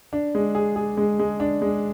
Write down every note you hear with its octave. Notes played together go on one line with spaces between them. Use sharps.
D4
G#3
G#4
G#4
G#3
G#3
D4
G#3